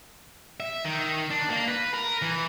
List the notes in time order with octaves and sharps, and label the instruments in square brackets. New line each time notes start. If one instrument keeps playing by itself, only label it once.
[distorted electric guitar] E5
D#3
D4
A#3
B4
A#4
E3